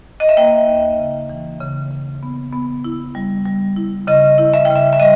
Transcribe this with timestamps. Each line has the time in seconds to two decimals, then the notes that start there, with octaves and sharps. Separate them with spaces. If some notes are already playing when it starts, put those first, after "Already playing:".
0.20 D#5
0.29 E5
0.37 A#3 G5
0.67 D#2
0.98 C#3
1.29 E3
1.60 C#3
1.91 C#3
2.23 B3
2.53 B3
2.84 E4
3.15 G3
3.45 G3
3.77 E4
4.07 C#3 D#5
4.38 E4
4.54 E5
4.65 C#3 G5
4.76 E5
4.93 E5
5.00 G3 D#5